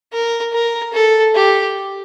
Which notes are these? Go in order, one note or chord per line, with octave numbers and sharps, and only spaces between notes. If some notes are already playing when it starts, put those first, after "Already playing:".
A#4
A#4
A4
G4